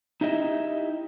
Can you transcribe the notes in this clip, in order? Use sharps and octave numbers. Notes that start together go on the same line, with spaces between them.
D#4 E4 G4 D#5 E5